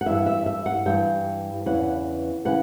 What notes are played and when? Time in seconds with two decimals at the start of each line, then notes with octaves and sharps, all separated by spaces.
0.01 F#5
0.06 G2 E3 E5
0.26 E5
0.46 E5
0.66 F#5
0.86 G2 E3 G5
1.66 E2 C#3 E3 F#5
2.45 C#3 E3 F#5